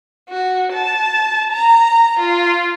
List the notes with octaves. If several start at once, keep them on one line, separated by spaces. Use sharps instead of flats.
F#4
A5
A#5
F4